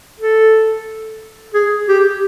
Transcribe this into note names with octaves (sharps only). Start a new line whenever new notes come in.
A4
G#4
G4